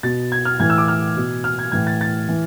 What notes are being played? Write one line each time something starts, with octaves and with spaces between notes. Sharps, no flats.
B2 A6
G#6
F6
A2 E3 G#6
E6
D6
F6
B2
F6
G#6
A2 E3 G#6
A6
A6
E3